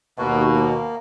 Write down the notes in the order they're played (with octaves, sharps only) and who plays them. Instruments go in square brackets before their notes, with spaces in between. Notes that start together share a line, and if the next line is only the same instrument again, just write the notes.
[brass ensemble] D#2 B2 [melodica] A#3 F#4
[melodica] A#3